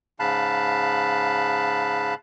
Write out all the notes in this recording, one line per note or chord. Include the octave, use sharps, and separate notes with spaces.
G#2 C#3 F5 A5 B5 F#6